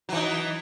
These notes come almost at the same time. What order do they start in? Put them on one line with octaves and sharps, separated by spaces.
F#3 E3 D#4